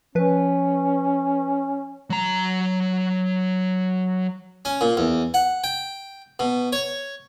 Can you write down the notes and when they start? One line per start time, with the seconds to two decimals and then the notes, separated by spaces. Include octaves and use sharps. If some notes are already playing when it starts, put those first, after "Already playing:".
0.15 F3 C#4 B4
2.10 F#3 A#5
4.65 C#4
4.81 A#2
4.97 E2
5.34 F#5
5.64 G5
6.39 B2
6.73 C#5